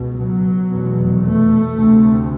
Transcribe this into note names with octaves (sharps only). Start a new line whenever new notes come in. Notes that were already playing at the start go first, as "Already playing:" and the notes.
Already playing: C#2 B2
F#3
F1 E2 B2
A3
D2 C3